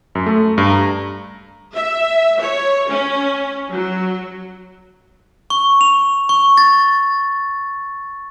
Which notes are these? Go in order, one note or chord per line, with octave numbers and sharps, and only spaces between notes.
F#2
A3
G2
A#5
E5
C#5
C#4
F#3
C#6
F7
C#6
A6